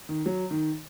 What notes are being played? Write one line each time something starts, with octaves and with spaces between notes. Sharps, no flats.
D#3
F#3
D#3